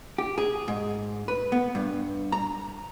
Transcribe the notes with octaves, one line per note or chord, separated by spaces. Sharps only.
G4
G#4
G#2
B4
B3
G2
A#5